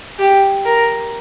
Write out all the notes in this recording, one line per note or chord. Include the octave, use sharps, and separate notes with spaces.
G4
A#4